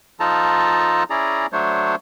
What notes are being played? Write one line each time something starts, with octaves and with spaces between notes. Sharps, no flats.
F3 D#4 F4 A4 A5 A#5
C#4 E4 G#4 D5 A#5
F#3 A3 D4 C5 C#5